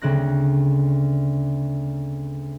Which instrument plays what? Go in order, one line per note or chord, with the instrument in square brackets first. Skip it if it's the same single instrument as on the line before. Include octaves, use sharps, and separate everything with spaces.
[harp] D2 C#3 C4 F#6 A#6